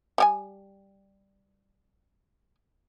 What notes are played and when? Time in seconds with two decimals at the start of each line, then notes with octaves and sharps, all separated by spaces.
0.18 G3 G4 G#5